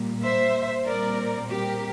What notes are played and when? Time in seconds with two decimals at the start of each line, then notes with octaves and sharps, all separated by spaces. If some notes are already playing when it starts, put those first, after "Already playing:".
Already playing: A#2 G3 A#3
0.22 C5 E5
0.86 A#2 G3 C4 A#4 D5
1.49 G4 A#4